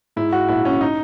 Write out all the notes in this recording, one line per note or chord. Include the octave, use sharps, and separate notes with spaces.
G#2 E4
F#4
A#1 E4
C#4
D#4